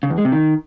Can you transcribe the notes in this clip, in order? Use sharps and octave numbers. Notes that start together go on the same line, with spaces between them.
C#3
E2
G#3
C3
D#3